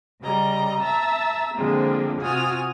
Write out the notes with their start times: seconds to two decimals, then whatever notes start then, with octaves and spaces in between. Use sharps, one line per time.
0.22 C#3 G3 D#5 A#5
0.83 E5 A5 A#5 E6
1.55 D3 F3 G#3 A#3 C4
2.21 C3 F4 F#4 G#5 D#6 F6